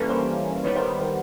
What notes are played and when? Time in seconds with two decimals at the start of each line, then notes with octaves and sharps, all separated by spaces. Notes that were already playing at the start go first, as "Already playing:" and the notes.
Already playing: E3 G3 A#3 C#4 A4 B4
0.09 A#4 C5
0.64 D#3 G3 B3 B4 C#5
0.76 A#4 C5
1.00 A#4 C5